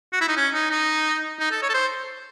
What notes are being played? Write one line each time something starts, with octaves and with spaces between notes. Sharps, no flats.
F#4
E4
D#4
C#4
D#4
D#4
D#4
A4
C#5
A4
C5